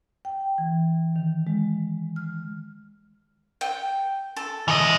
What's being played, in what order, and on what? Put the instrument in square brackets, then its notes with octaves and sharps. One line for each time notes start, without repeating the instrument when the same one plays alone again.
[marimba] G5
E3
D#3
G#3
F6
[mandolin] G5
A4
[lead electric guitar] E3 D#5